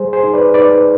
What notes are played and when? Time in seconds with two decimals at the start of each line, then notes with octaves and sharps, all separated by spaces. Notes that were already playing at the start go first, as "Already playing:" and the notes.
Already playing: G3 G#4 C5
0.13 G#4 C5
0.23 D#4
0.33 B4 D5
0.54 D#4 B4 D5